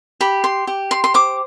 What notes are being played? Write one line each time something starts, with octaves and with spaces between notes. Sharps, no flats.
G4 B5
C6
G4
C6
C6
C5 D6